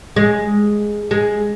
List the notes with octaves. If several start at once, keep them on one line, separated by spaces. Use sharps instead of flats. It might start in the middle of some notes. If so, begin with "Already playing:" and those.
G#3
G#3